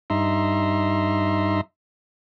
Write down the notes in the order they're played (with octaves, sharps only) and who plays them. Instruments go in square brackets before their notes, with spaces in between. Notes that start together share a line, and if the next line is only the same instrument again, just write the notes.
[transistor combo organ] G2 D#4 E5 A#5 C6